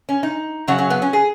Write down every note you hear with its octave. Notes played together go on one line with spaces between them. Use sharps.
C#4
D#4
F#2 C#3 F#3 F#4
C#4
B3
C#4
G#4